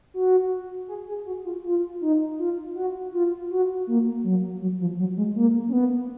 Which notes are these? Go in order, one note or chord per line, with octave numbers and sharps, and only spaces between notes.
F#4
G#4
G#4
F#4
F4
F4
D#4
F4
F#4
F4
F#4
A#3
F#3
F#3
F3
F#3
G#3
A#3
C#4
B3